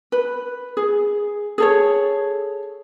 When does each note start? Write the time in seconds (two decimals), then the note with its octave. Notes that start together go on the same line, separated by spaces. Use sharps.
0.12 B4
0.77 G#4
1.58 G#4 A4 C#5